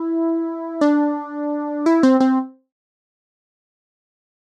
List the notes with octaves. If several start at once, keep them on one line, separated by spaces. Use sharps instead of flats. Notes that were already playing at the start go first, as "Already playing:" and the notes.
Already playing: E4
D4
E4
C4
C4